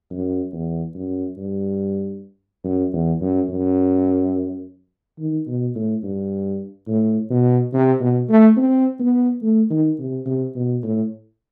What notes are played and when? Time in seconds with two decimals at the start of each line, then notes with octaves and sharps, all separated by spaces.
0.11 F#2
0.53 E2
0.95 F#2
1.37 G2
2.64 F#2
2.93 E2
3.21 F#2
3.49 F#2
5.19 D#3
5.47 B2
5.75 A2
6.03 G2
6.88 A2
7.30 B2
7.73 C3
8.01 B2
8.29 A3
8.57 C4
9.00 B3
9.42 A3
9.70 D#3
9.99 C3
10.26 C3
10.55 B2
10.83 A2